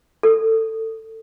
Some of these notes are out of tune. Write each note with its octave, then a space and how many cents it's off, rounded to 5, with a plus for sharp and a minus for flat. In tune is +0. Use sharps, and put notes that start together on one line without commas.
A4 +20